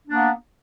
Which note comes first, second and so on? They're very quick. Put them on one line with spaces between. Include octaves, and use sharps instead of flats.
D4 A#3 B3